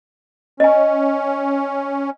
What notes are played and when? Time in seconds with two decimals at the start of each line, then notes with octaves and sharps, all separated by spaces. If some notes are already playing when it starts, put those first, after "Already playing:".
0.60 C#4 D#5 G#5